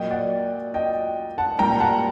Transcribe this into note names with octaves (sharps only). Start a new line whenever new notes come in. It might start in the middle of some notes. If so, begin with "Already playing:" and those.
Already playing: A#2 F#3 A#3 D#5 G5
D5 F#5
D#5 G5
F#5 A5
A#2 G3 A#3 G5 A#5
F#5 A5